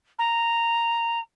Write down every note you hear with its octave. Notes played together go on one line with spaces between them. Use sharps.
A#5